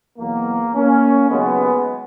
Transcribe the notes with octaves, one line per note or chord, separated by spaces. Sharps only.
E2 B2 F#3 A#3
A#3 C#4
D#2 C#3 F#3 G#3 B3